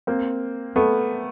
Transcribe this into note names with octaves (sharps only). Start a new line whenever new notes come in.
A#3 C4
A3 B3